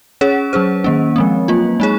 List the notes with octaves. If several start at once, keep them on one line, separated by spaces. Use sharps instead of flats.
C#4 G#4 C#5
F#3 C#4 G#4 C5
D#3 A#3 C#4
F3 G#3 C4
F#3 A#3 F4
G#3 D#4 G#4 C#5